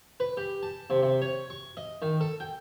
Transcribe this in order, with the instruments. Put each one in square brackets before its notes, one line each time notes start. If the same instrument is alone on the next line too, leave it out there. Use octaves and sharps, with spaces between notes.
[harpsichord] B4
G4
A5
C3
C3
C#5
C#6
D#5
D#3
A4
G5